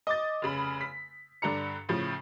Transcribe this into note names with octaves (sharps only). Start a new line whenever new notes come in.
D#5 D6 A6
F1 C#3 B5
B6
G2 D3 D4 A#5 C#7
A2 C#3 F3